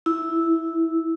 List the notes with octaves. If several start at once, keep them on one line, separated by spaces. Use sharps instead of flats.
E4